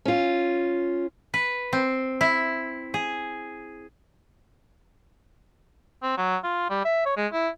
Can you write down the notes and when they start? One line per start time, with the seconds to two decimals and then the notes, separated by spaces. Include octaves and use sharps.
0.05 C#4 F4
1.34 B4
1.73 C4
2.21 E4
2.94 G#4
6.03 C4
6.18 F#3
6.44 F4
6.70 G3
6.85 E5
7.06 C#5
7.17 G#3
7.33 E4